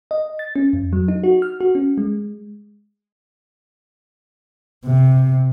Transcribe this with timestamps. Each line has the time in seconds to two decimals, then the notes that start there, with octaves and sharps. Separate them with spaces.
0.11 D#5
0.39 A6
0.56 C#4
0.73 F2
0.93 F#3
1.08 D#4
1.24 F#4
1.42 F6
1.61 F#4
1.75 C#4
1.98 G#3
4.85 C3